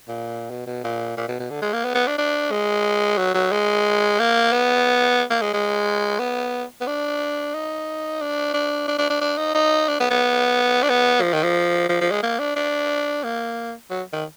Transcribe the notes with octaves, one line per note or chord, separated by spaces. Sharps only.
A#2
B2
B2
A#2
A#2
B2
B2
D3
G#3
A#3
B3
B3
D4
D4
G#3
F#3
F#3
G#3
A#3
B3
A#3
G#3
G#3
B3
B3
D4
D#4
D4
D4
D4
D4
D4
D4
D#4
D#4
D4
B3
B3
D4
B3
F3
D#3
F3
F3
F3
G#3
A#3
D4
D4
A#3
F#3
D#3